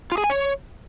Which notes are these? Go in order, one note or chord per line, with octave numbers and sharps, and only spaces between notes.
F4
G#4
G#5
C#5